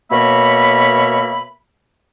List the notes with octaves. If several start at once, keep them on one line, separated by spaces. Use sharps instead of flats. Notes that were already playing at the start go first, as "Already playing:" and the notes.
B2 A#3 A#4 C#5 E5 B5